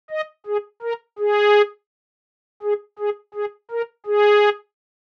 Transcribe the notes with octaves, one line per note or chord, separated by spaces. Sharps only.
D#5
G#4
A#4
G#4
G#4
G#4
G#4
A#4
G#4